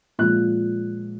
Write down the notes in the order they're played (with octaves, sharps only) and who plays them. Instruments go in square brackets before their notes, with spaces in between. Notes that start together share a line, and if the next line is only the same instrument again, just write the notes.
[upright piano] A#2 F3 G#3 F#6